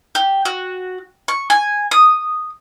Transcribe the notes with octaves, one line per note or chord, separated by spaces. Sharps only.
G4
F#4
C#6
G#5
D#6